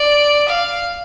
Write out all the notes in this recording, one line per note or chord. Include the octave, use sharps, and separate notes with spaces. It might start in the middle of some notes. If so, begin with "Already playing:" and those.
Already playing: D5
F5